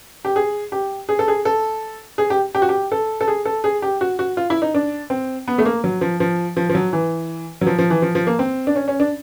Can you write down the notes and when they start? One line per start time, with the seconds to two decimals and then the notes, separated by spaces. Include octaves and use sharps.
0.25 G4
0.36 G#4
0.72 G4
1.09 G#4
1.19 A4
1.28 G#4
1.45 A4
2.18 G#4
2.30 G4
2.55 G4
2.62 F#4
2.69 G4
2.92 A4
3.21 A4
3.28 G#4
3.45 A4
3.64 G#4
3.82 G4
4.01 F#4
4.19 F#4
4.37 F4
4.50 E4
4.62 D#4
4.74 D4
5.10 C4
5.48 B3
5.58 A3
5.65 A#3
5.84 F#3
6.01 F3
6.20 F3
6.57 F3
6.70 F3
6.75 F#3
6.93 E3
7.61 F#3
7.66 F3
7.79 F3
7.90 E3
8.02 F3
8.15 F3
8.27 A#3
8.39 C4
8.67 D4
8.76 C#4
8.88 C#4
9.00 D4